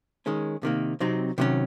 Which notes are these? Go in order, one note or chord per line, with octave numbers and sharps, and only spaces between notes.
D#3 G#3 C#4
C3 D#3 A#3
C3 F#3 C4 D#4
C3 D#3 F#3 C#4